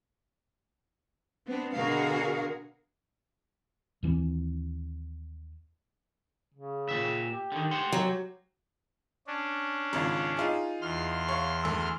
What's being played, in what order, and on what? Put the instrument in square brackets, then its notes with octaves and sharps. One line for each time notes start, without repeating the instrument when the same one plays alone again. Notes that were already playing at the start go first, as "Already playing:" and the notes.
[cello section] B3 C4 D4
B2 D3 F#4 G#4 A#4 F5
[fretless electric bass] D#2 E3 C4
[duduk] C#3
[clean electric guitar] A#2 D#3 E5
[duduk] G4
[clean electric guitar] D3 D#3
C5 F#5 C6
[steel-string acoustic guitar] F#3
[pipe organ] C#4 D4
[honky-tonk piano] G#1 C#3 F4
D#4 F4 G#4
[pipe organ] E2 C6 F6
[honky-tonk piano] C#5 F5
D2 E6